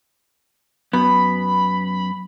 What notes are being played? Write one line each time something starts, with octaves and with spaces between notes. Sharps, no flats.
F#2 B3 B5